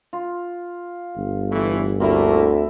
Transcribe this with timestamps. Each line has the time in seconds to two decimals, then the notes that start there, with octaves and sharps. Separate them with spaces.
0.13 F4
1.16 G1
1.50 E2 E3 A3
2.00 D2 A3 A#3 C4 E4 E5